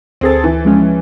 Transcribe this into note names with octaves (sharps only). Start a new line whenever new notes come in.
D2 C4 G#4 A4 A6
E3
F3 G#3 C#4